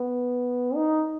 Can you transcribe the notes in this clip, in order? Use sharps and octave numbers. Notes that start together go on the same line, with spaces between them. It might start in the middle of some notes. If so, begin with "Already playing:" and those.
Already playing: B3
D#4